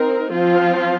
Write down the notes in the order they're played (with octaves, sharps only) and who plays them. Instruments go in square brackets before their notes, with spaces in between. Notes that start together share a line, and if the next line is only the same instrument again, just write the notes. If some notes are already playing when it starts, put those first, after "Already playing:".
Already playing: [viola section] C4 D#4 A#4
F3 C4 F4